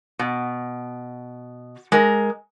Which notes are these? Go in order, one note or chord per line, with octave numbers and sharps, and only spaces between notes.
B2
G#3 A#4